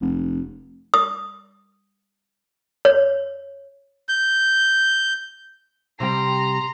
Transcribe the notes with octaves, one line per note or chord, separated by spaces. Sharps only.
F1
D#6
C#5
G6
C3 G3 G5 A#5 C6